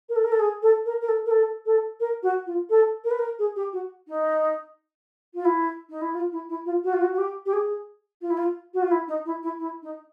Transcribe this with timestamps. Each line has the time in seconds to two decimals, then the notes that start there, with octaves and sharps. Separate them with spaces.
0.09 A#4
0.15 A4
0.24 A#4
0.32 A4
0.39 G#4
0.62 A4
0.85 A#4
1.01 A#4
1.08 A4
1.26 A#4
1.30 A4
1.65 A4
2.00 A#4
2.22 F#4
2.46 F4
2.69 A4
3.04 A#4
3.10 B4
3.18 A#4
3.39 G#4
3.56 G4
3.72 F#4
4.07 D#4
5.34 F4
5.45 E4
5.89 D#4
6.01 E4
6.14 F4
6.32 E4
6.49 E4
6.65 F4
6.84 F#4
6.93 F4
7.01 F#4
7.13 F#4
7.18 G4
7.46 G4
7.53 G#4
8.21 F4
8.30 E4
8.37 F4
8.74 F#4
8.82 F4
8.91 E4
9.07 D#4
9.25 E4
9.43 E4
9.59 E4
9.82 D#4